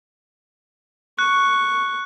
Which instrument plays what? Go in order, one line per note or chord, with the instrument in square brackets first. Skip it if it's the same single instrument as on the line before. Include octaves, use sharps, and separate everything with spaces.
[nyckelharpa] C#6 [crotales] F#6